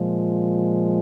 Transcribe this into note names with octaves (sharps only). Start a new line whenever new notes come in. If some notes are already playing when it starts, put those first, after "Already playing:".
Already playing: A#2 F3 G#3